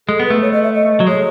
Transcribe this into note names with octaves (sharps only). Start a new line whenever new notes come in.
G#3 A4
B3
A3 B4
C#5
D#5
E5
D#5
F#3
G#3 C#5